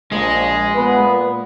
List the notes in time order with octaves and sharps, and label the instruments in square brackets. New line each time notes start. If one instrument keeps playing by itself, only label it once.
[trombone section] A#1 [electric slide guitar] G#3
[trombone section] A#2 B3 [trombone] B4